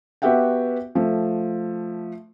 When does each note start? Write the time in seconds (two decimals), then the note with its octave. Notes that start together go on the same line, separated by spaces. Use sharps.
0.22 B3 F#4 G4 E5 F#5 G5
0.95 F3 A3